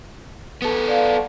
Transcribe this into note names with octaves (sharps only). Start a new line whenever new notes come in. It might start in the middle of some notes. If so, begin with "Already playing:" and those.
B3 A4
D5 F5